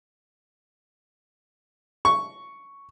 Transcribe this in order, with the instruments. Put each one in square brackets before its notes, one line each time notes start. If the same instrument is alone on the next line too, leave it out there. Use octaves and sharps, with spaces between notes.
[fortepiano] C#6